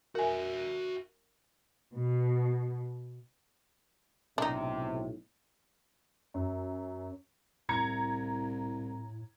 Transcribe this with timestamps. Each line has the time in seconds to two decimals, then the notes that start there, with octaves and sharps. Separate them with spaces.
0.15 F#4 A#4 E5 G#5
1.93 B2
4.38 B1 A2 C3 D4 D#4
6.34 F#2
7.69 C2 A2 A#5 G#6 C#7